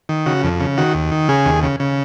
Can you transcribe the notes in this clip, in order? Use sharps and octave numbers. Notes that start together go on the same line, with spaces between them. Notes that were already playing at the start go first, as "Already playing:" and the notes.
D#3
C#3 F#4
F2
C#3
D#3 F#4
D#2
D#3
C#3 G#4
D#2
C#3
C#3